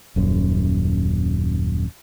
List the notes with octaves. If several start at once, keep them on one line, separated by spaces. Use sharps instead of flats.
D#1 F#2